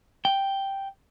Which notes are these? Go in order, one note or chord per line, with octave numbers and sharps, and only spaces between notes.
G5